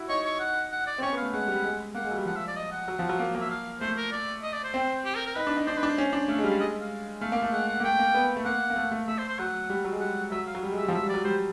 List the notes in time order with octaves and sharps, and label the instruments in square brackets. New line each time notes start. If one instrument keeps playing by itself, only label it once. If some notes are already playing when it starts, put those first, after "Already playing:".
Already playing: [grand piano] E4 F#4
[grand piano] D#4 [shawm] C#5
[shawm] C#5
F#5
F#5
D5
[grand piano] C4
[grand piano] C#4 [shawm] C#5
[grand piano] B3
[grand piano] A3 [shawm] F5
[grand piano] G#3 [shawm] F#5
[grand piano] G3
G#3
[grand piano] A#3 [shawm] F#5
[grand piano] G#3
F#3
G3
[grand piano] F3 [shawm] F#5
[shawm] E5
D5
D#5
F#5
[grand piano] F#3
F3
F#3
A#3
A#3
[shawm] E5
F5
[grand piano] A3 [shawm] C5
[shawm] A#4
D5
D#5
D5
C5
[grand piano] C4
[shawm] G4
A#4
A#4
[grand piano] D#4 [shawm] B4
[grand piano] D4
D#4
[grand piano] D4 [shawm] C5
[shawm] B4
[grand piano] D4
[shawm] C5
[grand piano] C#4
D4
[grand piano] A3 [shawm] F5
[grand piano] G#3
[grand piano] G3 [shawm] F5
[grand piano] G#3 [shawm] D#5
[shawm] F5
[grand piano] A3 [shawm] F5
[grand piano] A#3
A3
[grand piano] G#3 [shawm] F#5
[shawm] F#5
[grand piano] A#3
[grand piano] A3 [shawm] G5
[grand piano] A#3
B3
A3
[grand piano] A#3 [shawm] F#5
[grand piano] A#3
A3
A3
[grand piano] A3 [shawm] E5
[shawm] C5
C5
[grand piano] F#3 [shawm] F#5
[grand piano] G3
F#3
G#3
[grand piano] G3 [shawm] F#5
[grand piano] F#3 [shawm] E5
[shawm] F5
[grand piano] F#3
G3
G#3
[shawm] E5
[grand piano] G3
F3
[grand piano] F#3 [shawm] E5
[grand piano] G3
[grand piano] F#3 [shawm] D5
[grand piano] G3 [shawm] C5